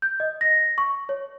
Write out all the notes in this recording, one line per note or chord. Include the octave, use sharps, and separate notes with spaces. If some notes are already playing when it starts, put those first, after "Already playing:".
G6
D#5
A#6
C#6
C#5